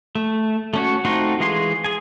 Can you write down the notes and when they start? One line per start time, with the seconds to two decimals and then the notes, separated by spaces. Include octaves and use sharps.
0.15 A3
0.74 A3 C#4 F#4
1.05 A3 C4 D#4 F4 F#4
1.40 E3 G#3 G#4 F5 C6
1.84 G#4 G#5